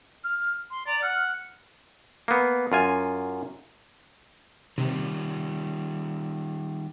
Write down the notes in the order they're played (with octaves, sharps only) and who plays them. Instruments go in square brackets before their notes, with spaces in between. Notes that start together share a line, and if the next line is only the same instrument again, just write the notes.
[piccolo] F6
C6
[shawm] D5 [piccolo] A#5
[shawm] F#5 [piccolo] F6
[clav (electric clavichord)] A#3 B3
F#2 F4 G#5
[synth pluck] C3 [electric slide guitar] D#3 G3